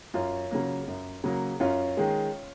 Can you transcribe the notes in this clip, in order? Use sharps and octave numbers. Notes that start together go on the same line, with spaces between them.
F#2 C#4 F4
C#3 F#3 A#3
F#2
C#3 F#3 A#3
F#2 C#4 F4
D#3 G#3